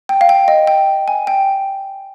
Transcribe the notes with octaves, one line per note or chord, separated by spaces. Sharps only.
G5
F5
G5
D#5
G5
G#5
G5